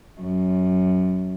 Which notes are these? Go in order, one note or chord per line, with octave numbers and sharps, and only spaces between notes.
F#2